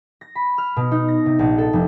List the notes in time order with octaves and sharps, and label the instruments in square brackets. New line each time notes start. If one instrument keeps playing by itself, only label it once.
[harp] A#6
B5
F6
B2
D#4
A#6
C3
A#1
A4
F1